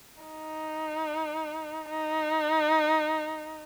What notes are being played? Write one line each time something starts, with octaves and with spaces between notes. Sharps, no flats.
D#4
D#4